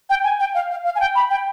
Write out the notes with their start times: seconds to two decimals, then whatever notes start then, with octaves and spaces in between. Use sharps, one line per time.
0.10 G5
0.24 G#5
0.40 G5
0.54 F5
0.70 F5
0.85 F5
0.95 G#5
1.00 G5
1.15 B5
1.30 G5